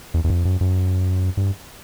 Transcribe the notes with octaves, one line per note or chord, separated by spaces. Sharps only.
E2
E2
F2
F#2
F#2
G2